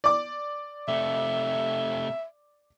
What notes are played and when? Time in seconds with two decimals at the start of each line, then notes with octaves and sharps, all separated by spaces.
0.04 D5 D6
0.88 C3 A3 E5